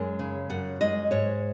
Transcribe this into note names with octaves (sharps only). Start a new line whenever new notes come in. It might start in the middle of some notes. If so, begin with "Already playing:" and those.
Already playing: F#2 G#3
C#3
F#2 F#5
G#3 D#5
G#2 C#5